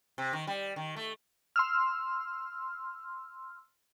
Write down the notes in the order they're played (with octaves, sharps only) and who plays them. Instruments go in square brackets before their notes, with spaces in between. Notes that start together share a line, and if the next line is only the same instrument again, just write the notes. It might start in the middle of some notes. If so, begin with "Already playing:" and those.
[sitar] C3
D#3
G3
D#3
A3
[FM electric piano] C6 E6 F6